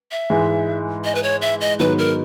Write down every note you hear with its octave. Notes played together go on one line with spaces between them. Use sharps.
E5
G#2 E3 G#3
D#5
B4
C#5
E5
D#5
G#2 D#3 F#3 B3 D#4 B4
A#4